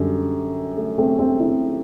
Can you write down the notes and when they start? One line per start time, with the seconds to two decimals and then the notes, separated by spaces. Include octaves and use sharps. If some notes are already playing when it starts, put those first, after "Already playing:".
Already playing: F#2 D3 G3
0.77 A3
0.98 A3 C4
1.19 A3 C4
1.40 C4 E4